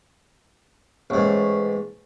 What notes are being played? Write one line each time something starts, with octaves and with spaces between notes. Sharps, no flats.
A1 G#2